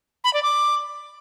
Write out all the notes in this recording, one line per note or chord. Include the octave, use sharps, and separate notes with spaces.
B5
D5
D6